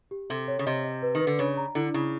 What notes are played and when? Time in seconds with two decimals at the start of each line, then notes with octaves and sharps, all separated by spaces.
0.11 G4
0.30 C3 A4
0.48 C#5
0.59 C#3
0.66 C3 D#5
0.84 D#5
1.02 B4
1.15 D#3
1.20 B4
1.27 D3
1.39 C#3 C#5
1.57 A#5
1.75 D3 E4
1.94 C#3 E4